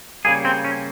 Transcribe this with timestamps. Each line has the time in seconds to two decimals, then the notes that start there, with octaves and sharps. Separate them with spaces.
0.25 C#3 G3 A#3 G#4
0.45 C4
0.64 C#4